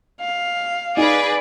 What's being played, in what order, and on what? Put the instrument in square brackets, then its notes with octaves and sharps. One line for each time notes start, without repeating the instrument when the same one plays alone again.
[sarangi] F5
[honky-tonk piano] D#4 [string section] G#4 B4 [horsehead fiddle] D5